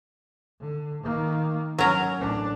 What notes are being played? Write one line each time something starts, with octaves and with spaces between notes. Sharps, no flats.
D3
D#3 A#3
F#3 C#4 A#4
A1 D4